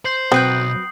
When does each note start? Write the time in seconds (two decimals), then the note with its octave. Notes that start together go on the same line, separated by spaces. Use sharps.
0.05 C5 G6 C7 F#7
0.32 B1 C4 F#4 B4 G5 D#6 C7